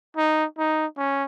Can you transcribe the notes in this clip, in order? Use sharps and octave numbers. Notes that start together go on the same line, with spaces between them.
D#4
D#4
C#4